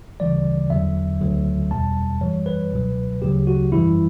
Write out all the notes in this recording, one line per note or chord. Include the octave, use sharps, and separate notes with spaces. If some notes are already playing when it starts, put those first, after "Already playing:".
D2 C#3 E3 G3 D5
E2 D3 F#3 E5
D2 D3 F#3
E2 B2 G3 A5
F#2 E3 G3 C#5
B4
C#2 B2 F#3
D2 C#3 F#3 G4
F#4
F#2 E3 G3 E4